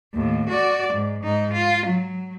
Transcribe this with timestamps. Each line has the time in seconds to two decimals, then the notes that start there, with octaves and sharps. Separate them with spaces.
0.14 D#2 A2
0.49 F#4 D5
0.93 G#2
1.24 G#2 D#4
1.54 F4
1.86 F#3